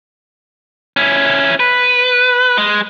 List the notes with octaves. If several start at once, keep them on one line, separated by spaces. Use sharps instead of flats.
C#4 E4
B4
G#3